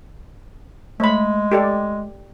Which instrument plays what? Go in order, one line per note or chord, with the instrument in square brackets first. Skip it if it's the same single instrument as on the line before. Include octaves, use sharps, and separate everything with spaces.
[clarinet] G#3 [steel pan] A3 B5
[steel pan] G4 A4 D5